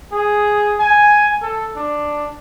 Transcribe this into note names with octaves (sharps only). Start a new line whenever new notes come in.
G#4
G#5
A4
D4